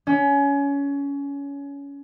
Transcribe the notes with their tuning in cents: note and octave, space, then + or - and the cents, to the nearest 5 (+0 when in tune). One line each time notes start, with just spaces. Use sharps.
C#4 +25